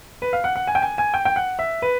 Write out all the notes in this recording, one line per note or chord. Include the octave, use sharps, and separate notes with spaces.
B4
F5
F#5
F#5
G#5
G5
G#5
G#5
G5
G5
F#5
E5
B4